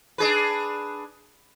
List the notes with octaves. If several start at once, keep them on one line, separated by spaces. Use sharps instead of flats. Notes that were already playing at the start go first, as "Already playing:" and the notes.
D4 G#4 B4